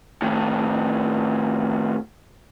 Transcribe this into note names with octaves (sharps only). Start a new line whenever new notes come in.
A2 D#3